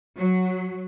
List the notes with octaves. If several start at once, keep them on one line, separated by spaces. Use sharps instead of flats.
F#3